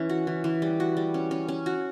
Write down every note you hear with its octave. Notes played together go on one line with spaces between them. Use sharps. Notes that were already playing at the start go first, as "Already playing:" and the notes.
Already playing: E3 C#4
F#4
E3
E3
G3
F#4
G3
C#4
C#4
C#4
F#4